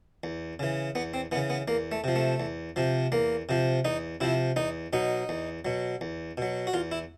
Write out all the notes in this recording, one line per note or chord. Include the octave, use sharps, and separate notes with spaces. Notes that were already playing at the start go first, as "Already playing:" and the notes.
E2
C#3 E3
E2 B3
C4
C#3 E3 B3
B3
E2 A#3
A3
C3 F3
A3
E2
C3 F3
E2 A#3
C3 F3
E2 D#4
C3 F3 E4
E2 D#4
B2 F#3 D#4
E2
B2 F#3
E2
B2 F#3
F#4
E2 F4
E4